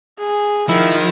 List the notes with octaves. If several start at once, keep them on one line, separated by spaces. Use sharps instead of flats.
G#4
D#3 F3 E4